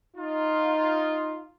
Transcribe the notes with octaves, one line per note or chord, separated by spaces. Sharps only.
D#4 F4